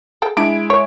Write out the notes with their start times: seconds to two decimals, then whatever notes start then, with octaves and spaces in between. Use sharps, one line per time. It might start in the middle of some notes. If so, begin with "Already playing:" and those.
0.22 G#4 A4 G5
0.37 G#3 D4 E4 D7
0.70 C#5